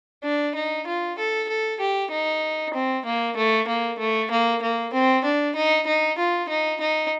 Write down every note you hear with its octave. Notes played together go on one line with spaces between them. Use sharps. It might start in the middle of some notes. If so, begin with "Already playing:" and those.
D4
D#4
F4
A4
A4
G4
D#4
C4
A#3
A3
A#3
A3
A#3
A#3
C4
D4
D#4
D#4
F4
D#4
D#4